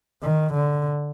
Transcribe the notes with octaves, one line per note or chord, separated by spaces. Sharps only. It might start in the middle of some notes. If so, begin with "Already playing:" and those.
D#3
D3